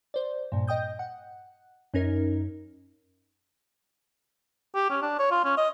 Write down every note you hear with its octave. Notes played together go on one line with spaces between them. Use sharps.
C5 D5
G2 A#2
D#5 G5 D#6 G6
F#5
F#2 C#4 D#4 A#4
G4
C#4
D4
C#5
F4
C#4
D#5